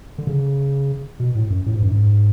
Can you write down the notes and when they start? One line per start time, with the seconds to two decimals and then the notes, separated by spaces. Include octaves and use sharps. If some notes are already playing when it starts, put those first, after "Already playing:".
0.18 D3
0.27 C#3
1.20 B2
1.35 A2
1.50 F#2
1.66 A2
1.74 G#2
1.83 F#2
1.92 G#2